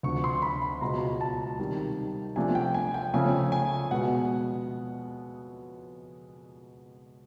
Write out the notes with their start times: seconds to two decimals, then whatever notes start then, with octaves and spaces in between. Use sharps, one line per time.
0.03 D2 D3 F3 C#6
0.24 C6
0.42 B5
0.62 B5
0.81 C#2 B2 G#3 A#5
1.21 A5
1.59 C3 D#3 G3
2.36 C3 F3 A3 D4 G#5
2.55 G5
2.74 G#5
2.94 G5
3.14 C#3 F3 A3 C#4 G#5
3.52 G#5
3.91 B2 G#3 B3 F#5